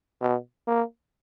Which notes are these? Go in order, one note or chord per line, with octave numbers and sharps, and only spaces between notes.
B2
A#3